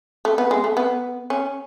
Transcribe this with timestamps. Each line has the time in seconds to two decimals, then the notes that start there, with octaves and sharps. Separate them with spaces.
0.25 A3
0.38 B3
0.51 G#3
0.64 A3
0.77 B3
1.30 C#4